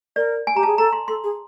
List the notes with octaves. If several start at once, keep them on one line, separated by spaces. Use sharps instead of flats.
A#4 D5
G#5
G4 A#5
G#4 A5
A4 A#5
C6
A4 C6
G#4